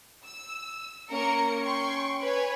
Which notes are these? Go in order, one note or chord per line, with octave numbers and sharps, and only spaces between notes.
E6
A#3 C#4 A#4 C#7
G5 C6 C#6
B4 C#5 G#5